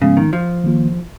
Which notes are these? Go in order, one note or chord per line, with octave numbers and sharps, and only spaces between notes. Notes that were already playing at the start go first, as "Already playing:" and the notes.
G#2 C#3 F3 G#3 B3
D#3
F3
D#3 A#3 F4